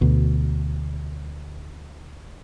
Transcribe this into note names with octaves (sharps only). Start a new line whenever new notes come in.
D2 B2